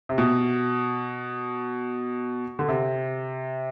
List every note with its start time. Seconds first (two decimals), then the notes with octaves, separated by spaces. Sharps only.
0.09 C3
0.18 B2
2.59 D3
2.68 C3